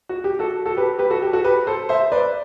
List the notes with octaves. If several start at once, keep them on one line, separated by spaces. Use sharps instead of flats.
F#4
G4
F#4 A4
F#4 A4
G4 B4
G4 B4
F#4 A4
G4
F#4 A4
G4 B4
A4 C5
C5 E5
B4 D5